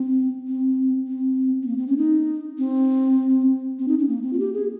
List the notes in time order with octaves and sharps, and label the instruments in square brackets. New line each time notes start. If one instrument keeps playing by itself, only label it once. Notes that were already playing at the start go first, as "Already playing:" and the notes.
Already playing: [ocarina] C4
C4
C4
C4
A#3
C4
C#4
D#4
C4
C4
D#4
C#4
A#3
C4
F4
G4
G#4